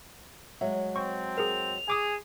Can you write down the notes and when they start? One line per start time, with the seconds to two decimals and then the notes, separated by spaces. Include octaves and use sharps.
0.61 F#3 G#3 E5
0.96 C4 C#6
1.38 G#4 A#4 F7
1.88 G#4 G#5 D6 D#6